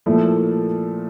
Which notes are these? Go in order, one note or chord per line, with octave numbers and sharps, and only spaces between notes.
A#2 F3 A3 E4